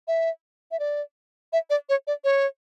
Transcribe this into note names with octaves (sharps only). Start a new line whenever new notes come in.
E5
E5
D5
E5
D5
C#5
D5
C#5